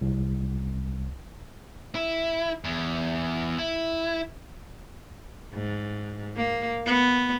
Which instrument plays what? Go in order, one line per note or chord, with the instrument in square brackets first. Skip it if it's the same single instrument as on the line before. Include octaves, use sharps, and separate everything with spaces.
[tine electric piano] C2
[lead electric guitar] E4
E2
E4
[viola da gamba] G#2
A#3
B3